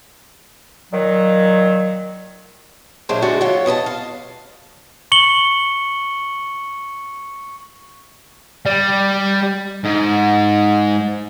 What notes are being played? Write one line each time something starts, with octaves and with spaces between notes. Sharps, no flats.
A#2 D#3 F#3
A#2 F#3 G#3 D4 E4 C5
D3 G#3 A3 F#4 D5
F#3 F4 G4 C#5 F#5
B2 D#5 G#5 A5
F5
C#6 C#7 F#7 G7
G3
G#2